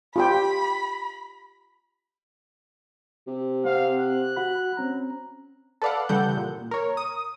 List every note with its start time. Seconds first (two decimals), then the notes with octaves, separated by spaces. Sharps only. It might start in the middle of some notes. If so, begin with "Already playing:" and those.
0.16 F4 G4 G5 B5
3.28 C3
3.65 C4 C5 F5 F#5
3.98 F#6
4.37 F#4 F#5 B5
4.77 C4 C#4 A#5
5.82 A4 B4 D5 F5 F#5
6.09 C#3 E3 G3 A4 F#5 G6
6.37 A#2
6.71 A#4 C#5
6.97 D#6